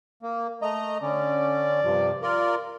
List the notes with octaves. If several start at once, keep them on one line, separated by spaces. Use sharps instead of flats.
A#3
A3 D#5 A#5
D3 C#4 D5
G2 C3 F3
F4 A#4 D5